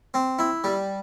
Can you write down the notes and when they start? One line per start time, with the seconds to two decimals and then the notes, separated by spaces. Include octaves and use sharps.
0.14 C4
0.39 E4
0.64 G3